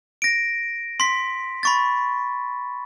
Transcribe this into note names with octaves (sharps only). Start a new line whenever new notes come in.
A#6 D7
C6 B6
B5 C#6 A6